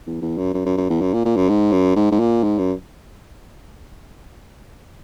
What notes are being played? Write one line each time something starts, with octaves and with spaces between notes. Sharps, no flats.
E2
E2
F#2
F#2
F#2
F#2
E2
F#2
A#2
A#2
F#2
G#2
F#2
G#2
G#2
A#2
G#2
F#2